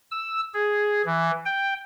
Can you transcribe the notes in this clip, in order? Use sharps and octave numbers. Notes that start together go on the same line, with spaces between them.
E6
G#4
E3
G5